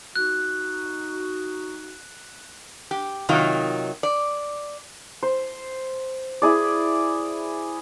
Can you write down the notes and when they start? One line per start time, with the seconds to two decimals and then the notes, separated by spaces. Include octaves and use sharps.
0.16 D#4 F#4 F#6
2.91 G4
3.29 C3 D#3 F#3 D#4 F4
4.03 D5
5.23 C5
6.42 E4 G#4 D5